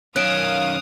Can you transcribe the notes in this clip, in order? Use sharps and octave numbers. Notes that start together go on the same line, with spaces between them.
F#2 D#3 C#4 F5 D#6 F#6 D7 E7